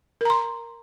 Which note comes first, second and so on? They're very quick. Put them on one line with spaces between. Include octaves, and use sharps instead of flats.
A#4 A#5 C6